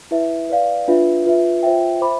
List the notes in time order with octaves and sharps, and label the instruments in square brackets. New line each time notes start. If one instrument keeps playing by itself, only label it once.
[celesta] E4 B4 E5
B4 D5 F5
D4 F4 B4 E5
F4 B4 E5
F4 C5 E5 G5
C5 E5 B5 D6